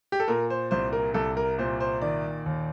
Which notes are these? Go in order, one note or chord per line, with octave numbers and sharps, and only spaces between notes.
G4
A4
A#2 A#4
C5
C2 C5
A#4
C2 A4
A#4
A#2 C5
C5
D#3 D5
D#2